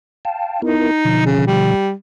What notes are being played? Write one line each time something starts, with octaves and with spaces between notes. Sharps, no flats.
F5 G5 A5
B3 D#4 E4 A#4
B2 D3 F3
C#3
G3